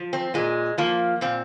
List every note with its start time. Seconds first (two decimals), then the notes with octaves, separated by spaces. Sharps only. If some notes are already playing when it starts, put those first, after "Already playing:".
Already playing: F3
0.13 C4
0.34 A#2 G#3
0.78 F3 A#3
1.21 A#2 C4